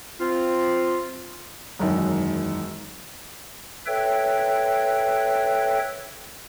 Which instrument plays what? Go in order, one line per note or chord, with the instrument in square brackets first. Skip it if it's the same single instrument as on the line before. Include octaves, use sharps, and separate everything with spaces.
[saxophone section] C4 F4
[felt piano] E1 F#2 D#3
[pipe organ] A4 B4 C#5 E5 G5